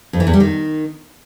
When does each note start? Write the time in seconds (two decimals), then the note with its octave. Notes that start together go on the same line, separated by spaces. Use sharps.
0.13 F2
0.20 E3
0.27 E2
0.33 G3
0.40 D#3